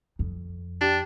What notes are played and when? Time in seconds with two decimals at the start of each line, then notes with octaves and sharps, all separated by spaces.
0.19 F2
0.81 D4 G4